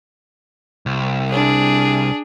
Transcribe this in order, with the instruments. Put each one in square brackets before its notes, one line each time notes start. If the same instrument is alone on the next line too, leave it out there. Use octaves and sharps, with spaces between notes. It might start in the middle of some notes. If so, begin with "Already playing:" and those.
[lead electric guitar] C2
[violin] D4 G#4